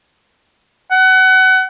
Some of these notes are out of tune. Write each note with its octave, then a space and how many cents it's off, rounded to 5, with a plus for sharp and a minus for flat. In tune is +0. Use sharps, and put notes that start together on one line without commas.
F#5 +25